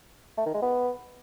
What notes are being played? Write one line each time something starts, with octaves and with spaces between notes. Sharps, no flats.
A3
D#3
G#3
B3